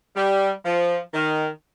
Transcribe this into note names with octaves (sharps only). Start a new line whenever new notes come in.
G3
F3
D#3